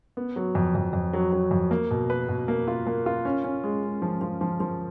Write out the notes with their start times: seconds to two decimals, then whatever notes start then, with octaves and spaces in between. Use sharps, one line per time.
0.17 B3
0.36 F#3
0.55 F2
0.75 F2
0.93 F2
1.13 F#3
1.32 F#3
1.51 F2
1.71 A#3
1.91 B2
2.10 B4
2.29 B2
2.48 A#3
2.68 F4
2.87 A#3
3.06 F4
3.25 C#4
3.44 C#4
3.64 G#3
3.83 G#3
4.02 F3
4.21 F3
4.41 F3
4.60 F3